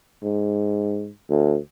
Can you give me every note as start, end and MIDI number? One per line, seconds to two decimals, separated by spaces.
0.23 1.10 44
1.29 1.57 38